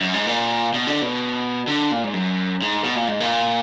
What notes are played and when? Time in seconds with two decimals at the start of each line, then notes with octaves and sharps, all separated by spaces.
0.01 F#2
0.14 G#2
0.27 A#2
0.74 B2
0.87 D3
1.02 B2
1.67 D3
1.91 A#2
2.04 G#2
2.14 F#2
2.62 G#2
2.84 B2
2.96 A#2
3.08 G#2
3.20 A#2